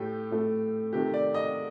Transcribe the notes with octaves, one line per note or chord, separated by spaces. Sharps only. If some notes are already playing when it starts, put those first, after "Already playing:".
Already playing: A2 A3 G4
A2 A3
C3 D#3 A3 G4
D5
D#5